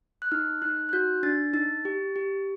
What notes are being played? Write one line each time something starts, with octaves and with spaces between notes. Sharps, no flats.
F#6
D#4 F6
D#4 F#6
F#6
F#4 G6
D4 A6
D#4 A6
G4
G4